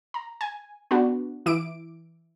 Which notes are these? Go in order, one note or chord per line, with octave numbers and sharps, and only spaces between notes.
A#5
G#5
B3 D4 F#4
E3 E4 D6 D7